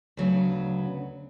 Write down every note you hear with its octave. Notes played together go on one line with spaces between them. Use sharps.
D2 C#3 F#3 B3